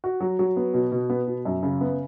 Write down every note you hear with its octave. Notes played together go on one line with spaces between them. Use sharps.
F#4
F#3
F#3
B3
B2
B2
B3
B2
F#2
C#3
B3